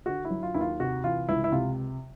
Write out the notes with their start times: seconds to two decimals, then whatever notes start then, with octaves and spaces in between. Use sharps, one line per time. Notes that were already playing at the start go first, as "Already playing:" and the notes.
0.06 D3 F#4
0.25 E4
0.30 F#3
0.43 F4
0.54 D#2 E4
0.61 F4
0.80 C3 F#4
1.04 E3 F4
1.28 C#2 E4
1.44 E4
1.52 C3 F4